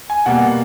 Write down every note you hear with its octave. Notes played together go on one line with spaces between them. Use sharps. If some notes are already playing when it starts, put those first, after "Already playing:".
G#5
B2 G3 A#3 F#5